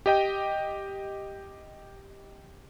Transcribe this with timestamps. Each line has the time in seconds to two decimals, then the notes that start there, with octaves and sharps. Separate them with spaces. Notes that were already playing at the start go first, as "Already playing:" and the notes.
0.06 G4 D#5 G5